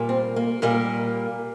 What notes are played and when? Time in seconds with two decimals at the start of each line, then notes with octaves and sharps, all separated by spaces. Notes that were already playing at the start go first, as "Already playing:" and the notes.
Already playing: A#2 G3 A#3
0.09 C4
0.36 A#3
0.62 A#2 G3 A#3